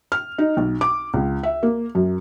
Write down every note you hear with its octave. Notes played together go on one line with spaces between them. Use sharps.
F6
D#4
B1
D6
C#2
E5
A#3
F#2